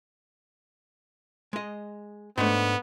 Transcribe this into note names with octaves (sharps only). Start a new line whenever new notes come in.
G#3 D#5
G#2 A3 B3 D4